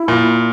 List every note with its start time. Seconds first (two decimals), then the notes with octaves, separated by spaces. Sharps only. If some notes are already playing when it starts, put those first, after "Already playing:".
Already playing: E4
0.08 A#2